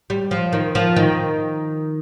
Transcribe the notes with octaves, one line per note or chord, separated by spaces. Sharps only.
G3
F3
D#3
F3
D#3